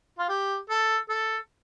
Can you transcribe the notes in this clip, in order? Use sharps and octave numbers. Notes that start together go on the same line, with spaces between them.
F4
G4
A4
A4